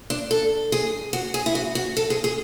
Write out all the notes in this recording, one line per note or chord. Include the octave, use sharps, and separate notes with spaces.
D4
A4
G#4
F#4
G#4
E4
F#4
F#4
A4
G#4
G#4